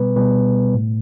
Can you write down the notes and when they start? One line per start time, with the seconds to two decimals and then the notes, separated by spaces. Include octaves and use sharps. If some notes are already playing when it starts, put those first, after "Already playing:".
Already playing: B2 G3 B3 B4
0.16 B2 G3 B3 B4
0.74 A2 A3